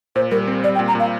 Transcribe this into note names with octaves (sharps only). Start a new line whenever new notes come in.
A#2 C5
G3 A#4
C4
G3 D5
G5
A#2
A#5
A#2 F5